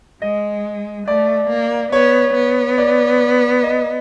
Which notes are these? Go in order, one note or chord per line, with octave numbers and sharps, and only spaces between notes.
G#3 D#5
A3 D5
A#3
B3 C#5
B3
D5
D#5